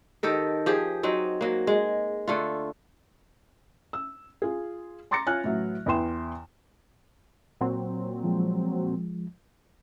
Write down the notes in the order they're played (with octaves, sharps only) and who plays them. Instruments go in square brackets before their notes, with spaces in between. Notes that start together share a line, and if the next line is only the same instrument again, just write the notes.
[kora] D#3 G4 A4 A#4
F3 G4 G#4
F#3 C4 D#4
F#3 A#3
G#3
D3 A3 F4
[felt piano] E6
F4 G#4
A#5 C6 D6 A6 A#6 C#7
F4 C#5 G#5 F6 F#6
A2 E3 F#3
E2 E4 B4 G5 C6 E7
[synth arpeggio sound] A#2 F#3 C4
[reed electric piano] F3 G#3